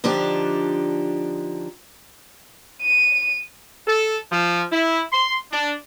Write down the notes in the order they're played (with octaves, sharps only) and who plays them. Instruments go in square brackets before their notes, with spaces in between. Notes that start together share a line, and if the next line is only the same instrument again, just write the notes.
[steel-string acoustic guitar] D3 F3 D4 D#4 G4
[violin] D#7
[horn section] A4
F3
E4
C6
D4